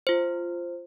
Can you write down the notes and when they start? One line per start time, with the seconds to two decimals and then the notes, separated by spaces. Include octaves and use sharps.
0.07 F4 C5